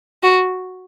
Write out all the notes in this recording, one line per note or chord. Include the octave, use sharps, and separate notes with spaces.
F#4